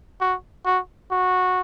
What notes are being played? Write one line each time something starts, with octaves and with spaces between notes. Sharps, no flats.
F#4
F#4
F#4